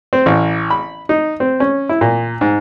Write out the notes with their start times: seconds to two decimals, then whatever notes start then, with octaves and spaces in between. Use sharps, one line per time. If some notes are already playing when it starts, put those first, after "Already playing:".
0.13 C4
0.26 A1
0.70 B5
1.09 D#4
1.40 C4
1.60 C#4
1.89 E4
2.01 A#2
2.41 G#2